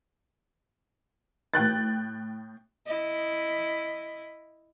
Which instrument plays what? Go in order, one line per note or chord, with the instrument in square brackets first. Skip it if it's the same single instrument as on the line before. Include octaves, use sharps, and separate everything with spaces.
[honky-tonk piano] A2 G5 F#6 A6
[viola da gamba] E4 D#5